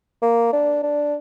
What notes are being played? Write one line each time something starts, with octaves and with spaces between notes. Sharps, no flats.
A#3
D4
D4